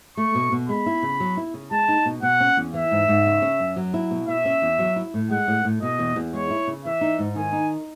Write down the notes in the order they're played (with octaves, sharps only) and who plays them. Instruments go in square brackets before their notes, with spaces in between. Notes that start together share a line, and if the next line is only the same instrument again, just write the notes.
[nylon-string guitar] A3 [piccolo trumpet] C#6
[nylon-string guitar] B2
B2
[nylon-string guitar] G#3 [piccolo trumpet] B5
[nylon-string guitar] E4
C#3
F#3
E4
C#3
[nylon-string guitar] G#3 [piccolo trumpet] A5
[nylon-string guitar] D#4
B2
[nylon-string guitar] B2 [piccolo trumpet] F#5
[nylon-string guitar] C#4
E2
[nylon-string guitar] E3 [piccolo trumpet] E5
[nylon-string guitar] G#2
G#2
C#3
C#4
F#2
F#3
E4
B2
[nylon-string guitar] B2 [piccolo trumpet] E5
[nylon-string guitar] C#4
E2
F#3
E4
A2
[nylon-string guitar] G#3 [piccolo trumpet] F#5
[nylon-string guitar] A2
A2
[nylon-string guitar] B2 [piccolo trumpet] D#5
[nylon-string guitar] E2
E2
[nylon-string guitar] G#3 [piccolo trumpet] C#5
[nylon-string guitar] E4
C#3
[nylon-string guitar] E3 [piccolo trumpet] E5
[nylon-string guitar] D#4
G#2
[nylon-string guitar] D#3 [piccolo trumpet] G#5
[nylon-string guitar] D#4